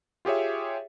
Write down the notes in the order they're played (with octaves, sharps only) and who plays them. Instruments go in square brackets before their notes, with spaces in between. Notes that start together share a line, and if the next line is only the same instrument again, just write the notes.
[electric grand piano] F4 G4 G#4 C#5 E5